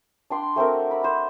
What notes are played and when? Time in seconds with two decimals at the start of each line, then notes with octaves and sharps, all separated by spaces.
0.30 D4 G5 C6
0.56 A3 C4 F#4 A#4
0.91 B5
1.04 C5